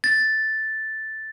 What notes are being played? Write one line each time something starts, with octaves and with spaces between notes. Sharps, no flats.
A6